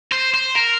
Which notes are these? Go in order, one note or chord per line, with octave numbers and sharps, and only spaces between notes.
C5
C5
A#4